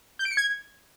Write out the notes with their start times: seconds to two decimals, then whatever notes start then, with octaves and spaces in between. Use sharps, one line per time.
0.19 G6
0.25 D7
0.31 C#7
0.37 G#6